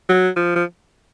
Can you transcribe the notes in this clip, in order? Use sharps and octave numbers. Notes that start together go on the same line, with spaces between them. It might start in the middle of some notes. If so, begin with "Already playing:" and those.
F#3
F3
F3